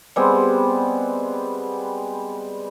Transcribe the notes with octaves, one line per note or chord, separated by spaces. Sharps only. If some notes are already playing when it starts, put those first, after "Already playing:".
G3 G#3 B3 C4